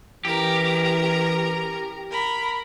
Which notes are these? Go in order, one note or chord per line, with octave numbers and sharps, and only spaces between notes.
E3 C#4 G4 A#4 A#5
A#4 B5